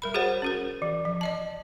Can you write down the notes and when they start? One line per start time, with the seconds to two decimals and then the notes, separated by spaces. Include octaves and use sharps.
0.02 G3 A#4 B5
0.14 F#4 G#4 A#4 C5 C#5 F#5
0.42 C#4 F#4 A#4
0.82 E3
1.05 F3
1.21 D5 D#5 A5